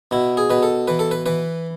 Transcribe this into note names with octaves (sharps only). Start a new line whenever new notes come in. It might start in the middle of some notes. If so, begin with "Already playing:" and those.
B2 E4
G#4
B2 B4
A4
E3 B4
A4
B4
E3 B4